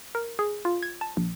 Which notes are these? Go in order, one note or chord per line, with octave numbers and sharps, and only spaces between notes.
A#4
G#4
F4
G#6
A5
A#1